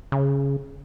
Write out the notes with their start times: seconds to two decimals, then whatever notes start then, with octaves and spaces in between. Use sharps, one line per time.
0.12 C#3